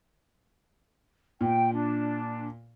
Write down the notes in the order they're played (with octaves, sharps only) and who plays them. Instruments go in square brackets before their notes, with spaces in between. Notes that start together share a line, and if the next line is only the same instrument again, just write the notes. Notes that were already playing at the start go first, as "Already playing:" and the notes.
[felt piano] A#2 [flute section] G5
[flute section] D4